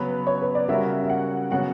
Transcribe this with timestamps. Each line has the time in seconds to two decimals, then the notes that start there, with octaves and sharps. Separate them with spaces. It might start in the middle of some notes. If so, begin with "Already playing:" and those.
Already playing: C#3 F#3 B3 B4
0.27 C#5
0.41 B4
0.55 D5
0.69 C#3 G3 C#4 F#4 A#4 E5
1.03 E5
1.09 F#5
1.51 C#3 F#3 B3 F#4 F#5